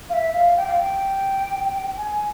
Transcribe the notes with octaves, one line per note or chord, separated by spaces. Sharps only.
F5
E5
F5
G5
F5
G5
G#5